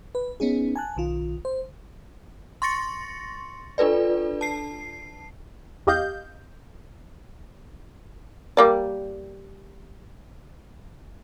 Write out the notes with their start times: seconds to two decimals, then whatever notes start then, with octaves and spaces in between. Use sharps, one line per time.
0.15 B4
0.40 B3 C#4 D#4 G#4
0.76 G#5 A5 F#6
0.96 B1 D#3 F4
1.45 C5
2.62 C6 C#6 A6 A#6 C#7
3.78 D4 F4 A4 B4 D5
4.41 A5 C7
5.87 E2 G4 D#5 F5 G6
8.57 G3 A#3 D5